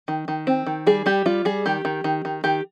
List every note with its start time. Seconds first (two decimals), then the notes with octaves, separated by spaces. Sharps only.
0.08 D#3
0.28 D#3
0.47 C4
0.66 D#3
0.87 G3 G#4
1.06 G3 G4
1.26 G3 F4
1.45 G3 G#4
1.66 D#3 G4
1.85 D#3
2.04 D#3
2.25 D#3
2.44 D#3 G4